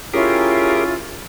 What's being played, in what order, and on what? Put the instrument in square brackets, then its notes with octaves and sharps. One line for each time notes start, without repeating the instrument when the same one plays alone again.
[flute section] C#4 E4 F4 [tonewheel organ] G4 G#4 A#4